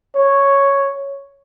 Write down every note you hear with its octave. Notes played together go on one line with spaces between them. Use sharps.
C#5